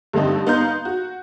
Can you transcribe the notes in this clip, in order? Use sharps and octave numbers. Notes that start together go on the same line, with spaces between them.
G2 D3 A3 C4 D#4
B3 D#4 F5 A#5 C6 G6
F#4